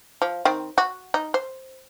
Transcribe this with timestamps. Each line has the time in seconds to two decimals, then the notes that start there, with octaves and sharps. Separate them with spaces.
0.22 F3
0.45 D#3 C4
0.78 F#4
1.14 D#4
1.34 C5